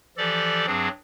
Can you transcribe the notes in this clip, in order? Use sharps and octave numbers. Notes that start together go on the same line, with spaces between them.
E3 F3 G4 A4 D5
G2 F#3 C4 D4 G#4